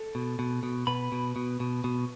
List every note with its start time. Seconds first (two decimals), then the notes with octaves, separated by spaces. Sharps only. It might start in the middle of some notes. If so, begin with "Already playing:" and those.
Already playing: A4
0.15 B2
0.39 B2
0.63 B2
0.87 B2 B4 B5
1.12 B2
1.36 B2
1.60 B2
1.84 B2